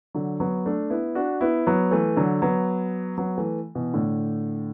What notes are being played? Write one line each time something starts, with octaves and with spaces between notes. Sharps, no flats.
D3 F#3
F#3 B3
A3 D4
B3 E4
D4 F#4
B3 E4
F#3 B3
E3 A3
D3 F#3
F#3 B3
F#3 B3
E3 A3
B2 E3
A2 D3